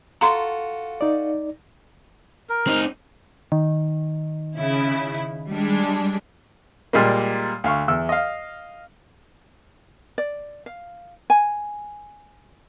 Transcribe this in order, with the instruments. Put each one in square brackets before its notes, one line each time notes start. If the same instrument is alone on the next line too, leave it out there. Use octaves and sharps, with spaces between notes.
[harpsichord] F4 F#4 A4 [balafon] A#5 C6
[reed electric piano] D#4 D5
[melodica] A#4
[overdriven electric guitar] C4 D#4
[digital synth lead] D#3
[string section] C#3 E4
G3 G#3 D4
[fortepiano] A#2 G3 G#3 A#3
D2 F5 C#6
E2 E6
D#5 F5
[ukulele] D5
F5
G#5